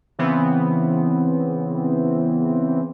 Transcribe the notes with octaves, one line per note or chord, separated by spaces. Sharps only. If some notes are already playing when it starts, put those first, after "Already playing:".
C#3 E3 B3 C4